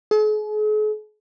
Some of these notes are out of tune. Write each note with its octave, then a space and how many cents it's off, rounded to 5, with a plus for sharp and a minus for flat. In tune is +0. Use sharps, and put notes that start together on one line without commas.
G#4 +45